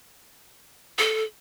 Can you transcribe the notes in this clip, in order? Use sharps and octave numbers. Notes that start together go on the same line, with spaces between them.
A4